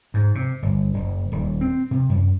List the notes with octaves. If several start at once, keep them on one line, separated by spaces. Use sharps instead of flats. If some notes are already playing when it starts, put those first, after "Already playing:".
G#2
C3
G1
F#1
D#1
C4
C3
F#2